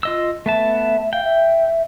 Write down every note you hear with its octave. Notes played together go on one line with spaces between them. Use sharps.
F4 D#5 E6
A3 B3 E5 A5
F5 G5
E5